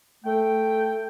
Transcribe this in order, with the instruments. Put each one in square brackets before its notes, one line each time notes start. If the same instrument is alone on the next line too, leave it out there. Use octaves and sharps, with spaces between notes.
[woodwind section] A3 G5